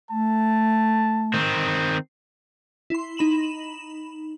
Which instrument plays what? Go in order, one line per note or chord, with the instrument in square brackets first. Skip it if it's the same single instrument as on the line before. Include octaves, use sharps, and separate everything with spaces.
[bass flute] A3 [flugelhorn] A5
[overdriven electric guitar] D#3 C4
[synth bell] E4 C6
D#4 B5 E7 F#7